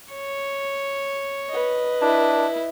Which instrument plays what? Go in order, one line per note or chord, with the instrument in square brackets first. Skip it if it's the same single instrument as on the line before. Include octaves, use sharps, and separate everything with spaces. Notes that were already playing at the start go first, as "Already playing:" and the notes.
[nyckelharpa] C#5
[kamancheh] B4 D#5
[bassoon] D4 [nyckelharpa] E4